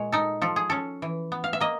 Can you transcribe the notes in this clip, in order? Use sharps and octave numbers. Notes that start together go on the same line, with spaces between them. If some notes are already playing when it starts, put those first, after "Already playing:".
Already playing: A#2 G#3 C#5
D#4 A4
F3 A4
G#4
C#4 A4
E3
B3
F5
E5
A#3 D#5